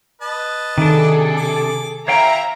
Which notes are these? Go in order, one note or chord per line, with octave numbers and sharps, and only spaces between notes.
B4 D#5 A5
C3 D#3 D4 G#4 A4
D6
C#4 E4 G4 C#5 E5 F5 G5 A#5